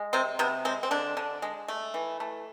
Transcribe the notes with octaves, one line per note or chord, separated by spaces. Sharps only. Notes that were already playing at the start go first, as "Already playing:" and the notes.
Already playing: G#3
C3 C4
C3 B3
G#3 C4
C4
D3 D4
D3
G#3
A3
E3
A3